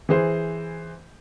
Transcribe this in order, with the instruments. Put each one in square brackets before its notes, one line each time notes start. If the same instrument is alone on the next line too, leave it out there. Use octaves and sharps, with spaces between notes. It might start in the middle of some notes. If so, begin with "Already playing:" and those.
[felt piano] E3 G#4 C5